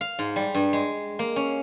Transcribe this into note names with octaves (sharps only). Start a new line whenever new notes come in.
F5
G#2
G3
G2
G#3
A#3
C#4